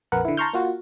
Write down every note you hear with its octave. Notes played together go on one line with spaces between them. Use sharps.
A#1 F2 A#4 B4 F#5
D3 E4
A5 A#5 C6 C#6 F6 G6
A#3 F4 F#4